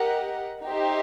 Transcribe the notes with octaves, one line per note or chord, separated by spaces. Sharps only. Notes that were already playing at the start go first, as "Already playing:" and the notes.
Already playing: G4 A#4 D#5 F#5
D#4 G4 C5 E5